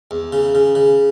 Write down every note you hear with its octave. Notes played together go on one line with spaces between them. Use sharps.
E2
C#3
C#3
C#3